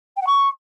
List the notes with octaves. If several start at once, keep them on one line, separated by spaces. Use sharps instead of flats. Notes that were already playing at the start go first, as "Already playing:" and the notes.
G5
F#5
C#6